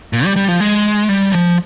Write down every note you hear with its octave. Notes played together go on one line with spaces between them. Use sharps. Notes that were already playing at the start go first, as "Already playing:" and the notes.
A#2
G3
G3
F3
G#3
G3
F3